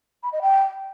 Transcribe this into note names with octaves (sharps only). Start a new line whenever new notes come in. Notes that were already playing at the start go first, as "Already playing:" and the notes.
B5
D#5
G5